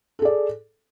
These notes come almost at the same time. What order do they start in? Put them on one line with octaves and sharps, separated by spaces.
A4 G#4 D5